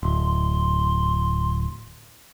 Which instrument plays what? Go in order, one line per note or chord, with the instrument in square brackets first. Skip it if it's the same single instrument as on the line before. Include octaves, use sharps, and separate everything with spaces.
[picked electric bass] D1 [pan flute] C6